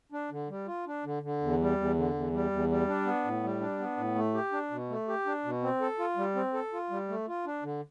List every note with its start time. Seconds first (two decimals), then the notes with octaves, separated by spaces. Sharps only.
0.12 D4
0.31 D3
0.49 G3
0.67 F4
0.87 D4
1.05 D3
1.23 D3
1.41 E2
1.59 G3
1.78 E2
1.96 D3
2.14 E2
2.33 G3
2.51 E2
2.69 G3
2.88 D4
3.05 B3
3.24 A2
3.43 G3
3.61 D4
3.79 B3
3.97 A2
4.15 A3
4.34 G4
4.52 D4
4.71 B2
4.90 A3
5.08 G4
5.26 D4
5.45 B2
5.62 C4
5.81 A4
5.99 F4
6.17 G3
6.35 C4
6.53 A4
6.73 F4
6.90 G3
7.08 A3
7.28 F4
7.46 D4
7.63 D3